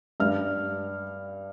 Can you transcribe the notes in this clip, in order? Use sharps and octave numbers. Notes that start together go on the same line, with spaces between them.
G2 G3 F6